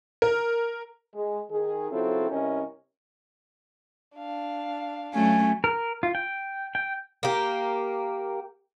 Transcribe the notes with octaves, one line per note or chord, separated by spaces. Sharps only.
A#4
G#3
D#3 G#4
C#3 F#3 C4 E4 F4 A4
G2 C3 C#4 E4 A#4 D#5
D4 F5
F#3 A3 C#4 G#5
A#4
F4
G5
G5
A#3 G4